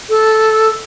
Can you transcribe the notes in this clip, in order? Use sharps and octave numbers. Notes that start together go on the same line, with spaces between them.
A4